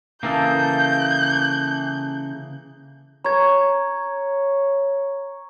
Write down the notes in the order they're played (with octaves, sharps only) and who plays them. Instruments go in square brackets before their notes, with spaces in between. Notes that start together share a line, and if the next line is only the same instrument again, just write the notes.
[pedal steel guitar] C#3 G#4 A4 [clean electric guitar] E3 A#3 [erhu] G6
[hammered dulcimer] C#5 [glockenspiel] A#5 G#6